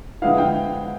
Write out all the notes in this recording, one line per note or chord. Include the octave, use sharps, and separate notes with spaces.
D3 F3 G#3 B3 E4 F5
G5